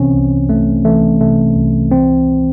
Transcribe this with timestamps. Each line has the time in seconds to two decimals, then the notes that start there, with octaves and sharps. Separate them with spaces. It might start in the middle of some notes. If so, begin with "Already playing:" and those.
Already playing: C2 C3 E3 C4 C#4
0.13 C2
0.48 C2 A3
0.85 E3 A3
1.20 C3 A3
1.57 C2
1.92 E3 C4